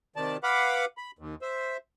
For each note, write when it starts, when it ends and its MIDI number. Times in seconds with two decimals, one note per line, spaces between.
0.16 0.37 48
0.16 0.37 51
0.16 0.37 74
0.16 0.37 81
0.43 0.85 71
0.43 0.85 77
0.43 0.85 78
0.43 0.85 83
0.43 0.85 86
0.97 1.11 83
1.19 1.35 39
1.42 1.77 72
1.42 1.77 76